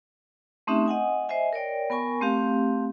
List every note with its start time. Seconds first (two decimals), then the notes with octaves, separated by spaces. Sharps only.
0.67 A3 C4 C#4 D#4 G4 E5
0.86 D#5 F#5 G#5 D#6
1.29 C5 D#5 E5 G#5
1.53 A#4 C#5 D5 G5
1.90 B3 A#4 G#5 C#6
2.21 A3 C4 G4 F5